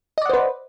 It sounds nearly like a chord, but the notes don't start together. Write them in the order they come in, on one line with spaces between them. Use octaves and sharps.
D#5 D5 F#5 C5 B4